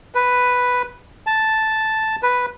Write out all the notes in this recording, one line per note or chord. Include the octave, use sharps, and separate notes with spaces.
B4
A5
B4